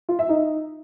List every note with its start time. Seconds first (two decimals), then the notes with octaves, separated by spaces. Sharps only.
0.09 F4
0.19 E5
0.29 D#4